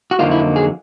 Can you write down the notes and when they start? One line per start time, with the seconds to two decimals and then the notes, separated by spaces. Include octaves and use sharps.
0.11 F#4
0.19 F2 D3 F#3 A#3 D#4 F4
0.31 E4
0.56 G#4